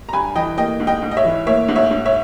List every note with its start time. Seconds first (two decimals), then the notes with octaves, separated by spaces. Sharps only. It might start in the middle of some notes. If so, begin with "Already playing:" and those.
0.09 A#5
0.13 G2 G#5 B5
0.35 E3 D#5 G5
0.58 A#3 D#5 G5
0.80 G#2
0.87 D#5 G5
1.02 G#2
1.11 D#5
1.17 C#5 E5
1.25 E3
1.46 A#3 C#5 E5
1.68 G#2
1.76 C#5 E5
1.91 G#2
2.06 C#5 E5